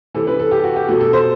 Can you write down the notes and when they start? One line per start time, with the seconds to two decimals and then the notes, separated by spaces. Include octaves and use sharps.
0.14 C3 E3 A4
0.27 B4
0.39 A4
0.51 G4
0.64 F#4
0.76 G4
0.88 B2 A4
0.91 F#3
1.01 A4
1.13 C5